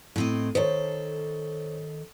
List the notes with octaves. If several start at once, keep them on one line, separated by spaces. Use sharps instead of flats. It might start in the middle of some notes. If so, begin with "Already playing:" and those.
A2 C4 D#5
D#3 A4 C5 C#5